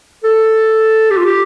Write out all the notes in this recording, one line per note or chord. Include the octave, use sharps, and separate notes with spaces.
A4
G4
F4
G4